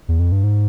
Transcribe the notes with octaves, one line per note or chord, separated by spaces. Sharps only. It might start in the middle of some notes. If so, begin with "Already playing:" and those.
E2
F2
G2
G#2